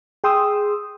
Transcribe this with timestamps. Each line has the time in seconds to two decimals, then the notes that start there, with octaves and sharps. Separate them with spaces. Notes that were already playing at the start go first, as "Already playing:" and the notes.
0.24 G#4 G5 C6 D#6 E6